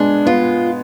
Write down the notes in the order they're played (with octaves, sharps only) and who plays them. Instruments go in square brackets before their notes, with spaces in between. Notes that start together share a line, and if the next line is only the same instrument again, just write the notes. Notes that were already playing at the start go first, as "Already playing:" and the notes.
Already playing: [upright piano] G#3 B3 [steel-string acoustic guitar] D4
[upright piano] B3 [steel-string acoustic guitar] F4